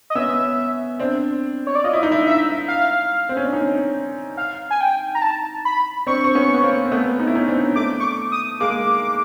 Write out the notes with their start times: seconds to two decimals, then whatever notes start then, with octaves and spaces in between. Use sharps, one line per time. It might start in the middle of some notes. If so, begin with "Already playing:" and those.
0.10 D#5
0.15 B3 C#4 E5
0.99 C4 D4
1.67 C#5
1.75 D5
1.84 F4 D#5
1.93 E4
2.03 D#4
2.12 D4 E4
2.26 E5
2.68 F5
3.29 C4
3.37 C#4
3.45 D4
3.53 C#4 D#4
4.37 F5
4.71 G#5
4.81 G5
5.15 A#5
5.22 A5
5.65 B5
6.07 C4 D4 C#6
6.24 C4
6.35 B3 C#4
6.54 B3
6.63 A#3 C4
6.85 C4
6.91 A3 B3
7.20 D#4
7.27 E4
7.35 C#4 D#4
7.48 C4 D4
7.76 A3 D6
8.00 C#6
8.04 D6
8.32 D#6
8.60 G#3 A#3 D6